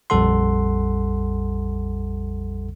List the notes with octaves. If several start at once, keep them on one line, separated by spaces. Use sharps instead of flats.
A#1 F2 G3 A4 F#5 C6